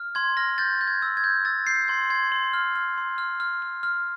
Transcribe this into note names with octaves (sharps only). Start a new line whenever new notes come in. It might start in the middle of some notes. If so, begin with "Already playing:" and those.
Already playing: F6
C6 G#6
F6 A#6
G6 A6
G6
G#6
E6
G#6
G6
E6 A6
G6 C7
C6 G#6
C6 G#6
C6
F6
F6
C6
F6
F6
F6
F6